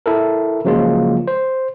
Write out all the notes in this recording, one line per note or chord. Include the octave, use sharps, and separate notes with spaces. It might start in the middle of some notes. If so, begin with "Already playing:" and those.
E4 A4 A#4
C#3 F3 F#3 G#3 A#3 F4
C5